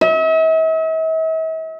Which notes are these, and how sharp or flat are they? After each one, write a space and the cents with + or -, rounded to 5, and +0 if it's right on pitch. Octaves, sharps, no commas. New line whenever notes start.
E5 -45